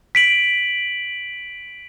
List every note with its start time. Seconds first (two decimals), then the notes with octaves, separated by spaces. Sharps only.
0.15 B6 D7 F#7